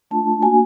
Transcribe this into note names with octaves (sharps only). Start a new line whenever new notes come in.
A3 D4 F4 A5
A#3 D4 F#4 G#5